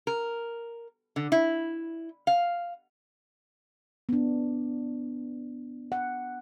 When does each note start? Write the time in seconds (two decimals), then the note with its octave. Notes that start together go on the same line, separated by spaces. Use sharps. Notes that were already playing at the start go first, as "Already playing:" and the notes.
0.07 A#4
1.16 D3
1.32 E4
2.27 F5
4.09 B3 D4
5.92 F#5